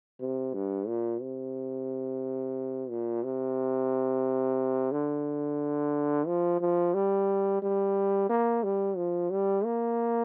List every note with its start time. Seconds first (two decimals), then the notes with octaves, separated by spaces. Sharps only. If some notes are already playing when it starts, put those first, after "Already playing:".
0.20 C3
0.54 G2
0.87 A#2
1.21 C3
2.90 A#2
3.24 C3
4.92 D3
6.27 F3
6.61 F3
6.94 G3
7.62 G3
8.29 A#3
8.64 G3
8.96 F3
9.31 G3
9.65 A#3